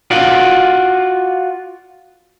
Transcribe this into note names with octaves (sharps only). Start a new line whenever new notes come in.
F4 F#4 D5